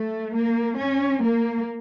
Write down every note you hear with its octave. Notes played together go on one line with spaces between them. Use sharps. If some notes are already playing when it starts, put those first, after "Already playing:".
Already playing: A3
A#3
C#4
A#3